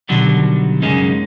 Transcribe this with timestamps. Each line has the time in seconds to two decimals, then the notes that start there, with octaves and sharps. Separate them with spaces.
0.09 B2 D3 D#3 F#3 G3
0.82 F#2 C#3 G#3 A#3 C#4 D#4